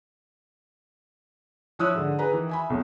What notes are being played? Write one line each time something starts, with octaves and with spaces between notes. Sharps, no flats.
F3 E4 C#5 D#6 E6 F#6
G#2 D3
G#4 B4 A#5
D#3 E3
E5 G#5 B5
B1 F2